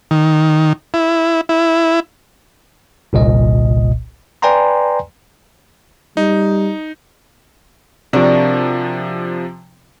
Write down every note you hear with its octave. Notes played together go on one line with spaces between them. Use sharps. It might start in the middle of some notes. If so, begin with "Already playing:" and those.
D#3
E4
E4
G1 C2 A#2 D#5
B4 D5 G5 G#5 A#5 C6
G3 D#4
C3 F3 D4 F#4 A#4